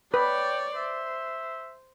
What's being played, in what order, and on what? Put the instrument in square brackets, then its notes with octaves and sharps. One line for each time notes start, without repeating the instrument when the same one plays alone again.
[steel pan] B4 [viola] C#5 D5 [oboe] G5
[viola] C5 [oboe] E5